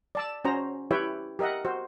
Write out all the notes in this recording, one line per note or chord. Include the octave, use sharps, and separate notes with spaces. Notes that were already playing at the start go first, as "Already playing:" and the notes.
D5 A5 E6
C#4 F#4 C5 A#5
E4 G4 B4 C#5 E5 G5
G4 A#4 D#5 E5 F#5
F#4 C5